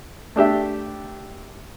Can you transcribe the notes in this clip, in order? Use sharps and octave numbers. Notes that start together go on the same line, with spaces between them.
A3 D4 G4 E5